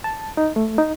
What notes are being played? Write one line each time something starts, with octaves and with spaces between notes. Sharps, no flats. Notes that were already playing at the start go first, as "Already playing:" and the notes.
A5
D#4
A3
D#4